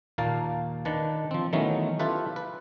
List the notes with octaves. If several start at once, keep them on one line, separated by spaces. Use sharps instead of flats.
D#2 A#2 A#3 F5 A5
D#3 D4 B4 A5
F3 C4
D#3 E3 F#3 A3 B3 C#4
E4 F4 G4 A4 B4 E5
B4